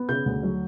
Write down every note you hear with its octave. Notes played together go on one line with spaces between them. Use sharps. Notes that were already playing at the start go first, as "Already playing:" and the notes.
Already playing: B3
C#3 G6
D2
F#3